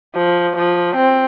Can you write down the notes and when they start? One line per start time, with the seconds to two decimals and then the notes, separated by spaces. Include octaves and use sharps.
0.15 F3
0.57 F3
0.96 C4